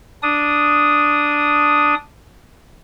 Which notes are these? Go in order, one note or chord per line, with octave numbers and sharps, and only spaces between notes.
D4 D#6